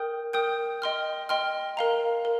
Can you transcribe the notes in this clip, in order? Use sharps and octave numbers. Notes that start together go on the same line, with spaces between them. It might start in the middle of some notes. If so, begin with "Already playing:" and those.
Already playing: A#4 G5 D#6 G6
A#4 G5 D#6 G6
D#5 G5 C6 F6
D#5 G5 C6 F6
A#4 F5 A#5
A#4